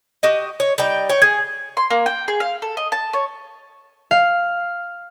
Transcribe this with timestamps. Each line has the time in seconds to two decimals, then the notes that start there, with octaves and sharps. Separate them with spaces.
0.23 F#4 G4 D#5
0.60 C#5
0.78 G3 D#4 G5
1.09 C#5 G5
1.22 G#4 G#6
1.77 C6
1.90 A#3
2.06 G5
2.28 G#4
2.40 F5
2.62 A4
2.77 D#5
2.92 A5
3.13 C#5
4.11 F5